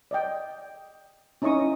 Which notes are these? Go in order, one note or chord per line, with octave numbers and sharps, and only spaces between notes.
D5 D#5 G5
C#4 D#4 E4 D#5 C#6 D#6